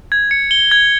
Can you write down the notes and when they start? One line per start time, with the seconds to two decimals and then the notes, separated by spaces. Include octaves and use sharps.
0.12 G#6
0.31 C#7
0.51 G7
0.71 G#6